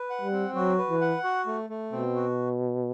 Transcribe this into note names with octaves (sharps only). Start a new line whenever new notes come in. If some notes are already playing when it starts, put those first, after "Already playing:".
Already playing: B4
F#5
G3
C4
F#3 F#4
B4
E3
F#5
F#4
A3
A3
B2 C4
F#4